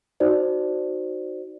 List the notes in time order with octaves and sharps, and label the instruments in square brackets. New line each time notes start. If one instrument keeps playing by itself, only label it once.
[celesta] D#4 F#4 C5 D5